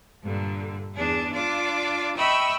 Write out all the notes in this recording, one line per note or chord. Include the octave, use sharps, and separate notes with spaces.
G2 A#2 D3
E2 D4 G#4
D4 F4 D5 D6
D#5 E5 G5 B5 C#6 E6